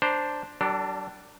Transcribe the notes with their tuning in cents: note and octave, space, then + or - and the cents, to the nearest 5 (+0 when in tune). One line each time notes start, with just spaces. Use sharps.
D4 +0 C5 +0 A#5 +20
G3 -45 D4 +0 A4 +45